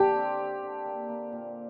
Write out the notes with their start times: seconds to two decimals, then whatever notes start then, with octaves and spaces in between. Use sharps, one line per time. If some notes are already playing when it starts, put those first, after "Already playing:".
Already playing: D3 A#3 D4 G4
0.16 C4
0.39 C4
0.63 D3
0.85 A#3
1.09 A#3
1.32 A#2